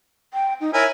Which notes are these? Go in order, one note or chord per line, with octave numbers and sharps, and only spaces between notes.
G5
D#4
E4 A#4 C#5 G#5